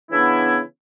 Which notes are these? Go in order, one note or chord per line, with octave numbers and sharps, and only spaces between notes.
C#3 E3 B3 D4 E4